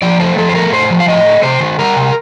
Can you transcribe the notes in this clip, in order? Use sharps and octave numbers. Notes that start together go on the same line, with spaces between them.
F3 D5
A3 C5
F3 A4
C5
A3 A#4
A2 C5
F3
F5
A2 D#5
A3
C3 C5
D#3
G3 A#4
C3